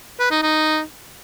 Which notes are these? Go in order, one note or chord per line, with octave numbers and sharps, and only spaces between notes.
B4
D#4
D#4